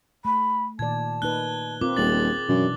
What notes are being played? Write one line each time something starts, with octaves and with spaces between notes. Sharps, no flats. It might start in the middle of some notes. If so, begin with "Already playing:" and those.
A3 B5
A#2 D#3 D5 A5 G#6
A#3 D#4 B4 F#6 G7
C4 F4 A#4 D6
D#1 G#4 A6 F#7
F#2 B2 E3 D4